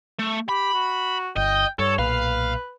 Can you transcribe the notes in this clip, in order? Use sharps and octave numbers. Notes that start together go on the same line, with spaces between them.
A3
G4 B5
F#4
G1 D#5 G5
G2 A4 C#5
B1 A#2 B4 F5